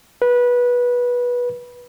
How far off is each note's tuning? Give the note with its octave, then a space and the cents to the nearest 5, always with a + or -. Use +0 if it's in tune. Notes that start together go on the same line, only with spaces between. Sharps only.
B4 -20